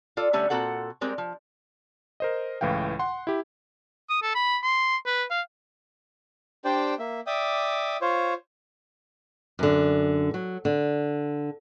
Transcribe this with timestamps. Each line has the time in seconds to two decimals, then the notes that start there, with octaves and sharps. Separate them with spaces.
0.17 F4 A4 D5
0.33 D3 G3 A3 C#4
0.50 A#2 C4 F#4 A4 F#5
1.01 G3 G#3 C4 A#4 D5
1.18 F3
2.20 A#4 C5 D#5
2.61 C#2 A2 E3 F5 G5
2.99 F#5 C6
3.27 E4 G4
4.10 D#6
4.22 A4
4.35 B5
4.63 C6
5.06 B4
5.31 F5
6.65 D4 G4 C5 D5 G5
6.99 A#3 E5
7.27 D5 E5 G5 D6 D#6
8.01 F4 C5 C#5
9.59 F#2 D3
10.34 F#3
10.65 D3